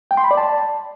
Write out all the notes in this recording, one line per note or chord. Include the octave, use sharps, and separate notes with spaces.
G5
C6
B5
D5
A5